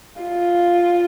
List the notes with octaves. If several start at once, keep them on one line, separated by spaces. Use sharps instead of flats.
F4